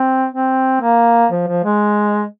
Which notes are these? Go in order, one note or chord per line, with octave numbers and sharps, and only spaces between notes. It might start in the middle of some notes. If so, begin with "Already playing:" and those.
Already playing: C4
C4
A#3
F3
F3
G#3